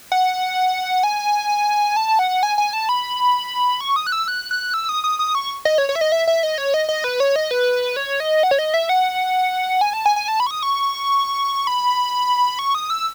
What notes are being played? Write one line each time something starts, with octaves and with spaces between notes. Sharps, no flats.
F#5
G#5
A5
F#5
G#5
G#5
A5
B5
C#6
D#6
F#6
E6
F#6
F#6
E6
D#6
D#6
D#6
C#6
D#5
C#5
C#5
E5
D#5
E5
E5
D#5
C#5
D#5
D#5
B4
C#5
D#5
B4
C#5
D#5
F#5
C#5
D#5
E5
F#5
G#5
A5
G#5
G#5
A5
B5
C#6
D#6
C#6
B5
C#6
D#6
E6